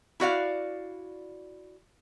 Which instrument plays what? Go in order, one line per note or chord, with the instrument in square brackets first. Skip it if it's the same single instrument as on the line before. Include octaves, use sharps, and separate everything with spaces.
[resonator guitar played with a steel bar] E4 F#4 D5 F5